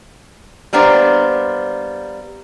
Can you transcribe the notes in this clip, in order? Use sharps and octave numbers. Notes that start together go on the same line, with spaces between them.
G3 A#3 B3 D4 C5